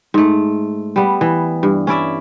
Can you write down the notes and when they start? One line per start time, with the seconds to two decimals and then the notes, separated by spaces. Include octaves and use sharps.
0.14 G#2 A3
0.96 G3 B3
1.21 E3
1.63 G2
1.87 C#4 E4 D5 E5